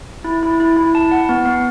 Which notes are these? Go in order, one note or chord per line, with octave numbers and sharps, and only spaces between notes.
E4
E4
E4
E4
A5
F#5
B3
B3